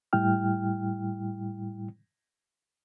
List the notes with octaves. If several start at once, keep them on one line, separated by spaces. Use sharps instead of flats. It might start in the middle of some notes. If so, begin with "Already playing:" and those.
A2 G3 E4 G5 F6